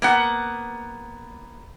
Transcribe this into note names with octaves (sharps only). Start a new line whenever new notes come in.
A#3 B3 F#5